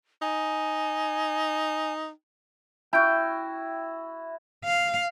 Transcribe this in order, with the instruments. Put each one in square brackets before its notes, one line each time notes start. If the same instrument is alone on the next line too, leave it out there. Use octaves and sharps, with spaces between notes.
[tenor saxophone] D#4 [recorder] G#5
[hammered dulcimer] E4 F#4 [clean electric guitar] G5
[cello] F5